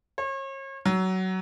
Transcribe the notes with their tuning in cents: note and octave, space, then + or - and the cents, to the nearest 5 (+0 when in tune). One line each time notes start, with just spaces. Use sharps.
C#5 -40
F#3 +20